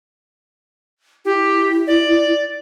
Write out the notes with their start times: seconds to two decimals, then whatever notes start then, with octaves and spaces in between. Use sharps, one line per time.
1.25 E4 G4
1.87 D5